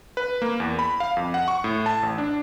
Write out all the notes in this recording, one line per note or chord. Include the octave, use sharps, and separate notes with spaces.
B4
A#3
E2
B5
F5
F2
F#5
C#6
A2
A5
A1
D4